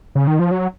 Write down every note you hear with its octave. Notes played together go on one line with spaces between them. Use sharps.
C#3
D#3
F3
F#3